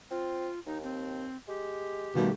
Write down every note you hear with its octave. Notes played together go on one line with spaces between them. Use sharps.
C4 F4
D#2 D#4
C4
G#3 G4
B2 D#3 G3 A3 A#3